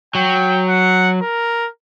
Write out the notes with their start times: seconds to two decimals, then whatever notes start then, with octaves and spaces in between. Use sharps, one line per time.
0.15 F#3 G5
0.69 F#5
1.22 A#4